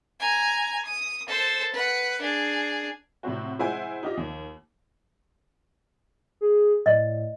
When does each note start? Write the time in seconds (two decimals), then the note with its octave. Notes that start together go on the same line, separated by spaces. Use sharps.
0.20 G#5 A#5
0.85 D#6
1.28 A4 C5
1.73 B4 F#5
2.21 D4 G#4
3.23 A2 C3 C4 F#4
3.59 G#3 E4 C5 F#5 G#5
4.03 D#4 F4 G4 D#5
4.17 D#2
6.41 G#4
6.86 A2 D5 D#5